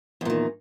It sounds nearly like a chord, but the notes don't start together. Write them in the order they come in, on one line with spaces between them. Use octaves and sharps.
E2 A#2 D#3